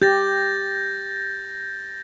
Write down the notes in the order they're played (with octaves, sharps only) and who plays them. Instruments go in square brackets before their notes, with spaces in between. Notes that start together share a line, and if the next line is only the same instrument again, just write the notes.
[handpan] G4 [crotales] G6 A6 A#6